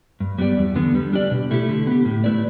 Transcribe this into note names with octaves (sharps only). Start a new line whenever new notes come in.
G2
G3 B3 G4 D5
E2
D3 B3
G3
D4 G4 D5
B2
A3 E4 G4
D3
B3 G4
A2
A3 E4 B4 D5